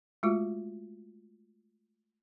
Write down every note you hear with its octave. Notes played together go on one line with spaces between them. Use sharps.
G#3 A3 F4 F#4